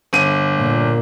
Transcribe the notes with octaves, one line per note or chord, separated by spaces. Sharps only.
G1 D#7
A#2